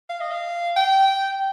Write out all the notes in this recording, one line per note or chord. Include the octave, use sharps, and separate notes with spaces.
F5
D#5
F5
G5